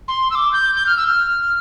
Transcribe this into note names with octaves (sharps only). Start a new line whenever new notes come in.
C6
E6
D6
G6
G6
F6
E6
F6